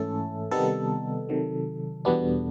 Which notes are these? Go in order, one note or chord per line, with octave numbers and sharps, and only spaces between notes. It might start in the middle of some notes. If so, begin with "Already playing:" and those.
Already playing: G#2 E3 A3 C#4 E4 A4
C3 D#3 G3 B3 D#4 A4
C3 D#3 F#3
E2 B2 G3 B3 D4